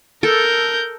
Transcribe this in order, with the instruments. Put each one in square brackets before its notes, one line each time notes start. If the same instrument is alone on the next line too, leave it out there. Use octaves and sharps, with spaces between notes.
[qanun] A4 [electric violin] A#4 G6